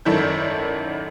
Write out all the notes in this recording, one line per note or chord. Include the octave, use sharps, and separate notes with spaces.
G#1 F#2 D#3 E4 A4 G6